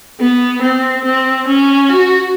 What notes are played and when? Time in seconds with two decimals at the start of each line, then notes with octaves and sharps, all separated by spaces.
0.20 B3
0.62 C4
1.05 C4
1.48 C#4
1.89 F#4